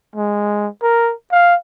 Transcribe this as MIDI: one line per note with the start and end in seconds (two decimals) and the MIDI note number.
0.16 0.67 56
0.82 1.13 70
1.32 1.55 77